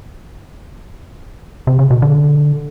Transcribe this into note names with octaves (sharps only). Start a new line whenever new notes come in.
C3
C#3
B2
D3